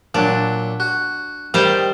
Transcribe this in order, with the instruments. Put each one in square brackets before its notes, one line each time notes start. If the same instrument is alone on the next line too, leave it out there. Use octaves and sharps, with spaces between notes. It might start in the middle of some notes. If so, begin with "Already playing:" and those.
[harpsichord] A#2 F#3 [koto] D4
[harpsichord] F#4
[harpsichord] D#3 G5 [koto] G3 G4 C5